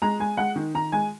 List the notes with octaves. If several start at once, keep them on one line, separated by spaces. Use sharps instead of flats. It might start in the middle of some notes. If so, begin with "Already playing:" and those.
G#3 A#5
G#3 G#5
G#3 F#5
D#3
D#3 A#5
G#3 G#5